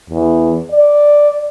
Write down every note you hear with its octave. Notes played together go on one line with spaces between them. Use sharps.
E2
D5